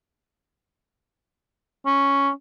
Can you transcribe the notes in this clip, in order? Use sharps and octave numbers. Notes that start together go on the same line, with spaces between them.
C#4